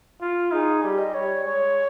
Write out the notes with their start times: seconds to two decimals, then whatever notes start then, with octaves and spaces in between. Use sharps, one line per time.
0.21 F4
0.52 D#4 G#4
0.83 G3 G4
0.98 D#5
1.14 G3 C#5
1.45 G#3 C#5